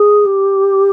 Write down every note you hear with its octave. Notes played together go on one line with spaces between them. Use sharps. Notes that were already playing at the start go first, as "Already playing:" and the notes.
Already playing: G#4
G4